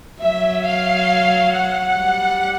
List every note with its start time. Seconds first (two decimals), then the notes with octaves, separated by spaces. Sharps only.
0.21 F#3 E5
0.65 F5
1.53 F#5
1.97 G3